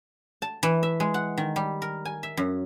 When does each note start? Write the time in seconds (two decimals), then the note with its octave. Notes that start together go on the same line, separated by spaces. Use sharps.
0.42 A5
0.63 E3
0.83 E5
1.00 G#3
1.14 F#5
1.38 D#3
1.56 G3
1.82 A#4
2.05 G#5
2.23 E5
2.37 F#2